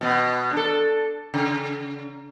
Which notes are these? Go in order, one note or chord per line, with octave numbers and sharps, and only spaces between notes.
B2 B3
D4 A4
C#3